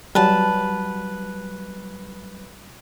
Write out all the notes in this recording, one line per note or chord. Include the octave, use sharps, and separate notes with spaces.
F#3 G3 B4 A5